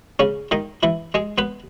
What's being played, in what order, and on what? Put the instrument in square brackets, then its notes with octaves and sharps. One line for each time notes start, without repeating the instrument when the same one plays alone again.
[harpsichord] C#3 C#4
D#3 D#4
E3 E4
G#3 G#4
B3 B4